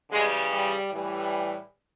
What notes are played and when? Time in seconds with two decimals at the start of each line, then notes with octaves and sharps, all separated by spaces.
0.10 C#3 E3 G3 G#3
0.51 G3
0.91 A2 E3 G3